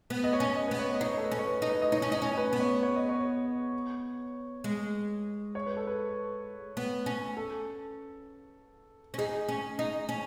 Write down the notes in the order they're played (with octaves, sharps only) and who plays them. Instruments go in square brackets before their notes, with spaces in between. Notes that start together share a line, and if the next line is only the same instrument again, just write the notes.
[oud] B3
[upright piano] D#5
C#5
[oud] C#4
[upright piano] D#5
[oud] B3 [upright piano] B4
[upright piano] C#5
D#5
[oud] D#4 [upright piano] C#5
[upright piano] A4
B4
[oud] C#4
[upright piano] C#5
B4
[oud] D#4
[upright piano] B4
D#5
[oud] D#4 [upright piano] C#5
[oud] C#4
[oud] D#4 [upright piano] C#5
[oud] C#4
[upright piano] B4
[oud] B3
[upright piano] C#5
C#5
D#5
C#5
[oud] G#3
[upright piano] C#5
B4
A4
B4
[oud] B3
C#4
[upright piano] A4
[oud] C#4
[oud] D#4 [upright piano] G#4
[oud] C#4
D#4
C#4